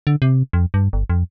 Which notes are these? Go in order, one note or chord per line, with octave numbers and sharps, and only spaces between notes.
D3
C3
F2
G2
G1
F2